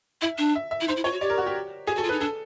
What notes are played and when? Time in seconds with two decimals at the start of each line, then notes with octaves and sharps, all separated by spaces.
0.21 E4 E5
0.38 D4
0.55 E5
0.71 E5
0.81 E4
0.88 D#4 C5
0.96 E4
1.04 F4 C#5
1.12 F#4
1.21 G4 D5
1.30 A#4
1.38 F#4
1.46 G4
1.87 G4 G#4
1.96 F#4 A4
2.04 F4
2.09 B4
2.12 D#4
2.20 D4 A4